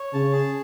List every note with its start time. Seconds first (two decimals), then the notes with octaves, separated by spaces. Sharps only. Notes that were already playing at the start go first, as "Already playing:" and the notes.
Already playing: C#5
0.13 C#3 A5
0.32 G#4